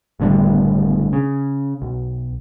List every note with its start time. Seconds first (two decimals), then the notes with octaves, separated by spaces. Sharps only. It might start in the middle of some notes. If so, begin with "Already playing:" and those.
0.20 F#1 A2 D3 G3
1.13 C#3
1.82 B1